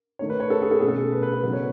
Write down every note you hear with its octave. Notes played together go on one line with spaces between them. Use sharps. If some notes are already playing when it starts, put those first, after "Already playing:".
D#3 A3 D#4 C#5
B4
C#5
A4
G#4
A4
B2 A3 C#4 G#4
A4
B4
B4
A4
C#3 F#3 B3 D#4 B4
C#5